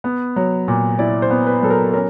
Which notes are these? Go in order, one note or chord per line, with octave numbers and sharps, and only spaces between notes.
B3
F#3
A#2
E4 D5
C5
B3
B4
F#3 A4
A#4
C#4 A#4